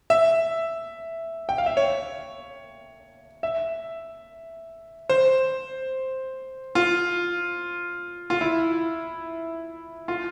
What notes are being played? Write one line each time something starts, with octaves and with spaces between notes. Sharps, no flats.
E5
G5
F5
E5
C#5
E5
C5
F4
F4
E4
F4